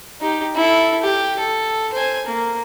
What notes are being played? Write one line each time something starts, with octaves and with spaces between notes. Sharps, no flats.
D#4 G4
E4 A4
G4
A4
C5 G#5
A#3